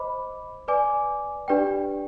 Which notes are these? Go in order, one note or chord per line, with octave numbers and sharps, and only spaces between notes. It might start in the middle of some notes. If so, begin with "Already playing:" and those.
Already playing: C5 D#5 B5 D6
B4 D5 G#5 D6
D4 G4 B4 D5 G5